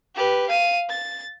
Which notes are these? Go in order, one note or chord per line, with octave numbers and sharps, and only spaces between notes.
G4 B4
F5 D#7
A6